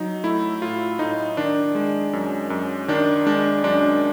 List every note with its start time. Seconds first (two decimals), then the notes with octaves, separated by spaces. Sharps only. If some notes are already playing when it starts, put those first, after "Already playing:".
Already playing: F#3 D#4
0.24 A3 E4
0.62 A2 F4
0.99 A2 D#4
1.37 D#3 D4
1.75 G#3
2.13 F#2
2.50 F#2
2.88 D#3 D4
3.26 G#3 D4
3.64 F#2 D4